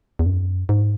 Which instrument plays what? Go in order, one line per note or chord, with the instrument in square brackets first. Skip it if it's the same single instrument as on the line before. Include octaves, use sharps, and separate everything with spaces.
[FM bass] E2
F#2
G#2